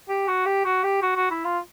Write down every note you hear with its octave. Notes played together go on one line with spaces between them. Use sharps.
G4
F#4
G4
F#4
G4
F#4
F#4
E4
F4